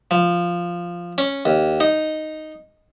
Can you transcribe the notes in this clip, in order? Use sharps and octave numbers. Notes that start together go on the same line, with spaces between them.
F3
C#4
D#2
D#4